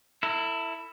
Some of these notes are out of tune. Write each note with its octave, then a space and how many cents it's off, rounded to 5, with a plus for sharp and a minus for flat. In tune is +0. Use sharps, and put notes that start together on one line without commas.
E4 +0 A4 +45